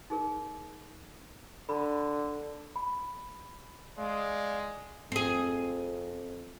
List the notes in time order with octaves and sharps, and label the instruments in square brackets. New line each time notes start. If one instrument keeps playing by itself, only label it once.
[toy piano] D#4 G#4 A#4
[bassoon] D3 [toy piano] B5
[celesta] B5
[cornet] G#3 [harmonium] D5 F5
[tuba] F2 [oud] C4 G#4